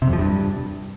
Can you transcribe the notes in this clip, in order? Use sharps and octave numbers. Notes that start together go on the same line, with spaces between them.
C3
F2
F3
G2